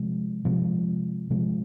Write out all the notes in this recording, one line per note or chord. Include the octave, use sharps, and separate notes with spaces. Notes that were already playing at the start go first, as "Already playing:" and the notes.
Already playing: C3 F3 G#3
C3 F3 G#3
C3 F3 G#3